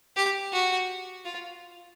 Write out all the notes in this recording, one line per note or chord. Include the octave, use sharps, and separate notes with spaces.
G4
F#4
F4